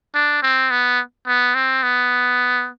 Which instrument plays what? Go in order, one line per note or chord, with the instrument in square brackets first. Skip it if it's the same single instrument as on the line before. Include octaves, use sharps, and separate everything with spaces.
[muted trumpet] D4
C4
B3
B3
C4
B3